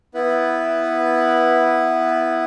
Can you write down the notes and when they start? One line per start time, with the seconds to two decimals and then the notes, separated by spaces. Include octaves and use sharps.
0.14 B3 E4 B4